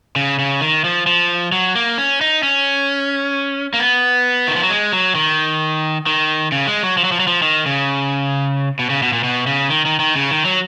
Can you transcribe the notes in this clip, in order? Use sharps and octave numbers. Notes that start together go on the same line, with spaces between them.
C#3
C#3
D#3
F3
F3
F#3
A#3
C#4
D#4
C#4
A#3
B3
D#3
F3
F#3
G#3
F#3
D#3
D#3
C#3
G#3
F#3
F3
F#3
F3
F#3
F3
D#3
C#3
B2
C#3
B2
A#2
B2
C#3
D#3
D#3
D#3
C#3
D#3
F#3